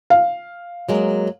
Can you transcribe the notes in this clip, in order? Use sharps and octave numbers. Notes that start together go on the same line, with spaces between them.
F5
F#3 G#3 A#3